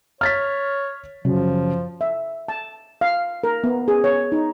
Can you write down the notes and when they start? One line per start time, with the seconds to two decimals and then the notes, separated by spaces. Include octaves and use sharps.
0.21 C#5 F6 A6 B6
1.25 F#2 C#3 F3
2.01 E5
2.48 A5
3.01 F5
3.44 A#4
3.64 B3
3.88 G#4
4.04 C#5
4.32 D#4